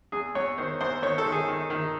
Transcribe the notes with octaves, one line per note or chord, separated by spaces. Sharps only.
E2 G#4
E2 C#5
D#3 C5
E2 C5
D#3 C#5
A4
D#3
G#4
D#3
D#3